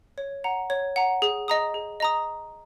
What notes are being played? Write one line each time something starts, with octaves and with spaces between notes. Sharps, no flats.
C#5
F#5 A#5
C#5
F#5 A#5
G#4
D#5 A#5 D#6
G#4
D#5 A#5 D#6